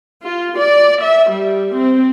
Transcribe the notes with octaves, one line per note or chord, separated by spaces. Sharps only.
F4
D5
E5
G3
C4